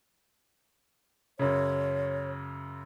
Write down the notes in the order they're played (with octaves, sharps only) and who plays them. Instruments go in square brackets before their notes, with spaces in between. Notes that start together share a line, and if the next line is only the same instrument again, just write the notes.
[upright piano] F#2 C#3 [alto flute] C#5